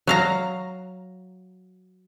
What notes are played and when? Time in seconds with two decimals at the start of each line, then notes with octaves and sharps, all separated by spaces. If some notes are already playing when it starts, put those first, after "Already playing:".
0.07 F#3 F5 A#5